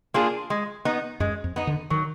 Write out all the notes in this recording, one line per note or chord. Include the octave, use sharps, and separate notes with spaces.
A#3 D4 F4 G#4
G#3
B3 D#4
F#2 G#3
F2
B3 D#4
D3
D#3 F#3